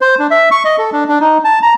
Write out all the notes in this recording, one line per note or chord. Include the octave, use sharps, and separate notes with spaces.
C5
D4
E5
C#6
D#5
A4
D4
D4
D#4
A5
A#5